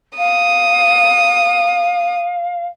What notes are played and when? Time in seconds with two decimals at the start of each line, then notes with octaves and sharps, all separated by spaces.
0.17 F5 D#6